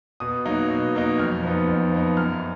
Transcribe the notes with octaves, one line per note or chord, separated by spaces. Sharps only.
B2 D#6
F#3 A#3 D#4
B2
F#3 A#3 D#4
F2 F6
F3 B3 D#4
F2
F3 B3 D#4
F#2 F6